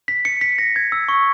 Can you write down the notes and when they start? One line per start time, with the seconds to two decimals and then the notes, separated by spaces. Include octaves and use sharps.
0.08 B6
0.25 C#7
0.41 B6
0.58 A#6
0.76 G#6
0.92 E6
1.08 C#6